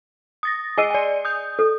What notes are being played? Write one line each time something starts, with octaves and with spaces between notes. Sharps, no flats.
D#6 A6 A#6
G#4 D#5 G#5 E6 C7 D#7
D5 G#5
D#6 G6
A4